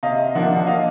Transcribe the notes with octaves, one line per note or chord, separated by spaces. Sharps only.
C3 D#5 F5
F3 A#3 D4 E5 F#5
F#5
D#5 F5